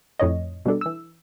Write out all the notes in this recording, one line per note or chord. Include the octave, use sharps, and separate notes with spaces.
F2 A2 C#5 D#5
B2 G3 D4 A4
E3 E6